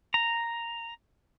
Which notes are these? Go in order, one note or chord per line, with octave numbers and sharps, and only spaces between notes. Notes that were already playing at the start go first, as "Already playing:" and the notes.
A#5